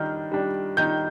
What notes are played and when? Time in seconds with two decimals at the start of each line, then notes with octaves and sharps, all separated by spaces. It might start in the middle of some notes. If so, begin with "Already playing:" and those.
Already playing: D#3 G3 D4 F6 G6
0.32 G3 D4
0.77 D#3 G6